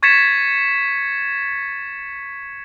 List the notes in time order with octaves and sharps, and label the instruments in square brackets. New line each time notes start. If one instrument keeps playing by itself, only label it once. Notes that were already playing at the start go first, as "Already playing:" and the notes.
[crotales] C#6 G#6 A6 B6 C#7 E7